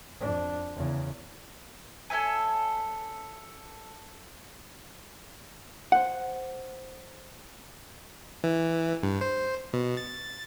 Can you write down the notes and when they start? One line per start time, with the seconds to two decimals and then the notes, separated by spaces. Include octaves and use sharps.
0.20 F2 D4
0.76 E2 C#3
2.10 A4 C#5 E5 G#5
5.92 C5 F#5
8.44 E3
9.03 G2
9.21 C5
9.73 B2
9.97 A6